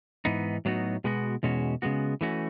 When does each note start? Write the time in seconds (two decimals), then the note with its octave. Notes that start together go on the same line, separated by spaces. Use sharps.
0.25 G#2 E3 B3 D#4
0.65 A2 F#3 B3 D#4 F#4
1.04 B2 G#3 B3 F#4
1.43 E2 B2 G#3 C#4 F#4
1.82 C#3 G#3 B3 F#4
2.21 E3 A3 C#4 F#4